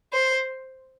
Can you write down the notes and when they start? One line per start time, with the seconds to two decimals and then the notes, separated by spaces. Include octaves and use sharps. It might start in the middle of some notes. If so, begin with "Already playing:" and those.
0.13 C5